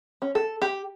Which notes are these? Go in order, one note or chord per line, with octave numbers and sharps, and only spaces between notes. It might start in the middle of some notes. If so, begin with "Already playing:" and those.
C#4
A4
G4